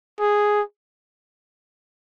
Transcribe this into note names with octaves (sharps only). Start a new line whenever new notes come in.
G#4